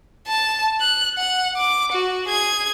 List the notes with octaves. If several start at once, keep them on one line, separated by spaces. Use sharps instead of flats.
A5
F#6
F#5
D6
F#4
G#4 G#6